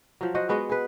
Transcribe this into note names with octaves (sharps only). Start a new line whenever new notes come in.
F3 F#3
F#4 C5 D#5 F#5
G#3 B3 F#4 D#5
G#4 B4